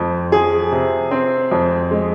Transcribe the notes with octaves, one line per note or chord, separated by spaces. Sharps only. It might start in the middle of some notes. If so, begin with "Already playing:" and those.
Already playing: F2 C4
F3 G#4
C3
C4
F2
G#3